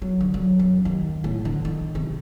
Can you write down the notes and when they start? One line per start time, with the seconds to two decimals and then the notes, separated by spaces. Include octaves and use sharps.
0.02 F#3
0.20 D3
0.34 F#3
0.59 F#2
0.85 D#2
1.24 A2
1.45 D3
1.65 D#3
1.95 C3